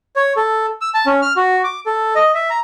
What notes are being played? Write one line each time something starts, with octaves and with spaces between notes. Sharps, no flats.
C#5
A4
E6
A5
C#4
F6
F#4
D6
A4
D#5
E5
A#5